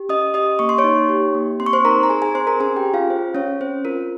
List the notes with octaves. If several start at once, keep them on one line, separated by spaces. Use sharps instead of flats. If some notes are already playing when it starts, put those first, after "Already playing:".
Already playing: G4
C#4 D#5 D#6
G4 D#5 D#6
A#3 C#6
C6
C#5 C#6
D#4
G4
A#3
C4 C6
C#6
C5 C6
D#4 A#4 A#5
A#5
G#4 G#5
G#4 G#5
C4 C5 C6
A#4 A#5
C#4 G#4 G#5
G4 G5
G#4
F4 F5
C#4 C5
C#4 G#4 C#5
C4 C5
F4 A#4